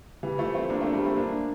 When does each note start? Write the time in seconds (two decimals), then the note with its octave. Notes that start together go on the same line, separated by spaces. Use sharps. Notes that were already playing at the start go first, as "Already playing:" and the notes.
0.23 E3 G3
0.38 F3 A3
0.54 A3 C4
0.70 A#3 D4
0.81 A3 C4
0.93 G3 A#3
1.05 A3 C4
1.16 A#3 D4